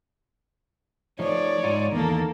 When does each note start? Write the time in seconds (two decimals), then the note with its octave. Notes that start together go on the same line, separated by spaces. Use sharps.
1.19 F3 A3 D#4 C#5 D5
1.63 G#2 D#4 F4
1.92 E2 D#3 A#3 A4